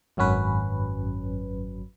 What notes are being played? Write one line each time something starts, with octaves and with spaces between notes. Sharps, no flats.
G#1 F#2 F#3 C#4 B4